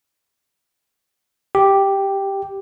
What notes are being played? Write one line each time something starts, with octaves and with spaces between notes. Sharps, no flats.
G4